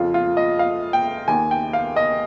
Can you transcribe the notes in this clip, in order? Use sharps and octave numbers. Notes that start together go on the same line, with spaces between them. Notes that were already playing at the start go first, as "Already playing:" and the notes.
Already playing: F2 C#3 F3 F4
F4
D#5
F5
G5
D#2 D#3 A#3 G#5
G5
F5
D#5